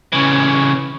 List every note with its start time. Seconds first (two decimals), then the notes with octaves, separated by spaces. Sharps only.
0.13 C#3 E3